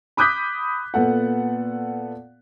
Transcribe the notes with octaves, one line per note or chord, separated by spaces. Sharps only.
B5 D6 D#6 F#6 G6 B6
A#2 B3 A4 F#5